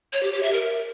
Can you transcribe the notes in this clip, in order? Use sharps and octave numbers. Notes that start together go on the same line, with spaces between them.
C#5
G4
G4
E5
A#4